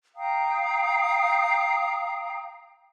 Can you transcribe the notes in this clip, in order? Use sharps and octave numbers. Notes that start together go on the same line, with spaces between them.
F5 G5 A#5 D#6